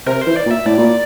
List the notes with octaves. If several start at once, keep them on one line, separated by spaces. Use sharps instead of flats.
C3 A#4
C5
E3
D5
A#2
E5
A2 D5
A#2